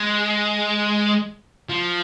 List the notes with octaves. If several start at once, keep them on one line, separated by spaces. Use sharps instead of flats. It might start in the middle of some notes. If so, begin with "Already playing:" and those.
Already playing: G#3
F3